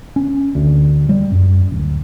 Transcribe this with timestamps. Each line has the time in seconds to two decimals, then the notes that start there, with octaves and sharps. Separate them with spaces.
0.16 C#4
0.55 D2
1.09 G3
1.32 F#2
1.72 D1